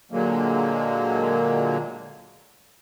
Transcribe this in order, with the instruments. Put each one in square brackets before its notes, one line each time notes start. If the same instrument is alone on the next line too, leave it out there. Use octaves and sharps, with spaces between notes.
[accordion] A#2 D3 F#3 G#3 A#3